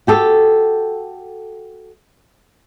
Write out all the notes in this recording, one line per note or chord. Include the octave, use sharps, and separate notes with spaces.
F#4 G4 A4